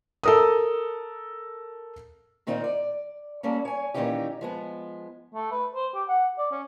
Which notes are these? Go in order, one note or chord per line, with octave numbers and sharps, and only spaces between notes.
A4 A#4 D#6
A#2 D#3 C4 D#4 F4
D5
G3 A#3 C#4 A4
C#5 G#5
A#2 D#3 E3 C#4 D#4 G4
F3 G#3 B3
A3
B4
C5
G4
F#5
D5
C#4